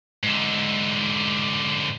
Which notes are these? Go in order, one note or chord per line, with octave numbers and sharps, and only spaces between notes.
G#2 D3